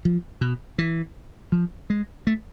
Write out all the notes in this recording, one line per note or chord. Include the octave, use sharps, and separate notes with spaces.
F3
B2
E3
F3
G#3
A3